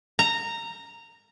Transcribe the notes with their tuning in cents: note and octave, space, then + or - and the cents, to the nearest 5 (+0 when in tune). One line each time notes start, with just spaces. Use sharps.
A#5 -15